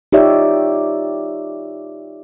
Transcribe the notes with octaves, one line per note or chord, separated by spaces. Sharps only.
D#4 F4 G4 C#5 D5 E5